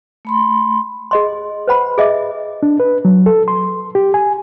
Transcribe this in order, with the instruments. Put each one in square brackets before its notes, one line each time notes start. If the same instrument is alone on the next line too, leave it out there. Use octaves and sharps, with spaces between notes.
[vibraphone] A3 B5 C6
[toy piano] G#4 D#5 C6
B4 C5 F#5 B5
G#4 D#5 E5 D6
[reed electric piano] D4
B4
F#3
A4
C6
G4
G#5